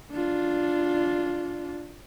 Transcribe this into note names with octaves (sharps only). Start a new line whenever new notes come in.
D4 F4